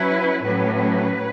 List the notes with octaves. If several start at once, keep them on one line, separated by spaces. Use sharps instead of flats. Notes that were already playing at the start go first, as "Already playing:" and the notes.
Already playing: F#3 C#4 E4 B4
A2 F#3 C#4 B4